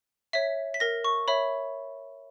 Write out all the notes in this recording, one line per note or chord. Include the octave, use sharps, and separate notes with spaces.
C#5 E5 B6
B6
A#4 A#6
C#6
C#5 E5 B5